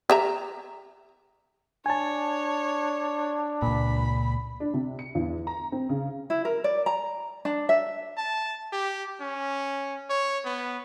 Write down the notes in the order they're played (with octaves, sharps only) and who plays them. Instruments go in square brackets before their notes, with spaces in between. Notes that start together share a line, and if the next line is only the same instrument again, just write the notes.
[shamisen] G4 E5 A#5
[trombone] D4 [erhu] C#5 [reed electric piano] G#5 A5
[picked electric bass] C#2 A#2 [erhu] B5
[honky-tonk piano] D4
C3
C#7
E2
A#5
C4
C#3
[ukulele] E4
A#4
D5
A#5
D4
E5
[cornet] A5
G4
C#4
C#5
B3